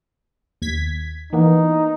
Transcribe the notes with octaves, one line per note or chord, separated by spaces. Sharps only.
D#2 G#6 B6
E3 A#3 B3 D#4